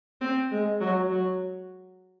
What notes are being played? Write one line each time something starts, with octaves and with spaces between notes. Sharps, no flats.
C4
G#3
F#3
F#3